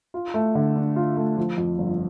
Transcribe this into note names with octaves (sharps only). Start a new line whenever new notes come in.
F4
A3
D3
D4
F4
A3
F3
F2
G1